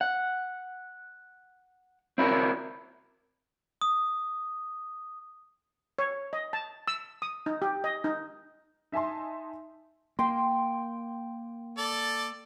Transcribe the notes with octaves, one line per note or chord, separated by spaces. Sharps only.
F#5
C4 E4 F#4 A#4
D#6
C#5
D#5
A5
E6
D#6
D#4
G4
D#5
D#4
D#4 E5 G#5 A5 C6
A#3 G5 C6
A4 D5